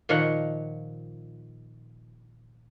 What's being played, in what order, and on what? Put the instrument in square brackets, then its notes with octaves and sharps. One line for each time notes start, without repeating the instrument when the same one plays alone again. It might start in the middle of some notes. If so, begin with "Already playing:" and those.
[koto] A#2 D#3 F3 C#5 F#5